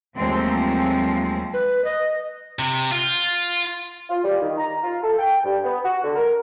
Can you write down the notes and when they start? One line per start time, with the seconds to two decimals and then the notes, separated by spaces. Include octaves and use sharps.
0.17 D#2 F3 F#3 G#3 A3 C4
1.53 B4
1.85 D#5
2.59 C3
2.91 F4
4.09 F4
4.23 G3
4.41 D#3
4.58 A#5
4.83 F4
5.02 A4
5.19 G5
5.43 G2
5.63 B3
5.84 F#4
6.03 D3
6.16 A#4